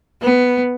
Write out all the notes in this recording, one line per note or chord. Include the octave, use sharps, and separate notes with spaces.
B3